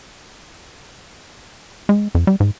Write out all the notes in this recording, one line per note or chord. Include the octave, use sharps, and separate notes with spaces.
G#3
F2
G3
G#2